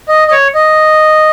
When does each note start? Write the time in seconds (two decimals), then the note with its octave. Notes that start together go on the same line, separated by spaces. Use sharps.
0.08 D#5
0.28 D#5
0.32 C#5
0.55 D#5